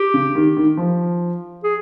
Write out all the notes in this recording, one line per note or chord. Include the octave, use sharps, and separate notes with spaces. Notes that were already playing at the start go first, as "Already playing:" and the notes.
Already playing: G4
C#3
D#3
D#3
F3
G#4